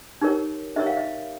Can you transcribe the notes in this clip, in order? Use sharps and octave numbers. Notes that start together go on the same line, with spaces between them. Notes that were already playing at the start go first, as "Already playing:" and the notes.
D#4 G4 A#4 C#5
D#4 G4 A#4 C#5 E5
F5
E5